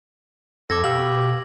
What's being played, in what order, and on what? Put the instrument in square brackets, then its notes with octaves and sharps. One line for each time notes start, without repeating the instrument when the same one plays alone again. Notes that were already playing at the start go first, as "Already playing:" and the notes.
[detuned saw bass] F2 [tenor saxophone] A4 [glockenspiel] D6 G#6 A#6
[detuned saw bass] B2 [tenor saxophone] G4 [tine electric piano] F5 E6 [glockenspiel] F#7